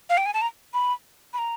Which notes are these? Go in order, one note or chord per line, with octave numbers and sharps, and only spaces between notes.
F5
G5
G#5
A5
A#5
B5
B5
A#5